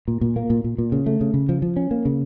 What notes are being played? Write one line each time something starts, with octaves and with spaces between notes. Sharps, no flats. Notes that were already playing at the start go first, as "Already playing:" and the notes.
A#2
A#2
A#3
A#2
A#2
A#2
C#3
A3
C#3
C#3
F3
F3
C#4
A#3
C#3